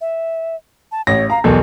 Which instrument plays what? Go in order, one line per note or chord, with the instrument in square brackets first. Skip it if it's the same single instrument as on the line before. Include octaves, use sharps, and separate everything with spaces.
[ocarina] E5
A5
[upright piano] A1 [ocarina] C#5 [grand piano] A#6
[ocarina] F5 [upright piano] A#5
[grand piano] B1 E2 [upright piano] A4 [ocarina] A#4